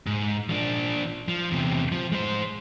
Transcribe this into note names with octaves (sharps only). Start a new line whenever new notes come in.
G#2
F3 D4
F3
E2 C3
F3
G#3 C5